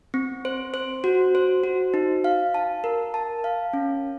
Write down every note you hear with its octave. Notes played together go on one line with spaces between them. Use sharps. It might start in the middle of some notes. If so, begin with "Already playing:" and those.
C4
C5
C5
F#4
C5
F#4
D#4
F5
A5
A#4
A5
F5
C#4